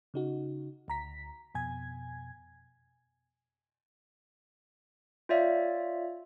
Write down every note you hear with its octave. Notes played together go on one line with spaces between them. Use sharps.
C#3 D#4 F#4
D2 A#5 B6
F2 B2 G#5 G#6
F4 C#5 D5 E5 F5